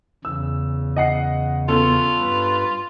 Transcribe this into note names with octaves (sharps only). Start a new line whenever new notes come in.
E2 C#3 E6
D#5 F#5 C7
B3 C#4 F4 A4
G2 B4